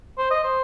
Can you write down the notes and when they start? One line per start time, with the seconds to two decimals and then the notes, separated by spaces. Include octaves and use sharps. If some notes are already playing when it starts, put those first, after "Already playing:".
0.18 C5
0.31 D#5
0.44 C5